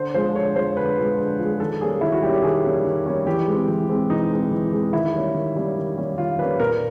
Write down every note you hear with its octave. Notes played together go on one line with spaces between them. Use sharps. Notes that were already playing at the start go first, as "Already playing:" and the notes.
Already playing: D3 C5
F3 G#3 C5
D3 C#5
F3 G#3 C5
D3 B4
F3 G#3
D3
F3 G#3
D#3 A4
G3 A#3 C#4 G#4
D#3 E4
F#4
G3 A#3 C#4 G4
G4
D#3 G#4
G3 A#3 C#4
D#3
G3 A#3 C#4
E3 G4
G#3 C4
E3
G#3 C4
E3 D#4
G#3 C4
E3
G#3 C4
D#3 E4
G3 A#3 C#4
D#3
G3 A#3 C#4
D#3
G3 A#3 C#4
D#3 F4
G3 A#3 C#4 B4
A#2 A#4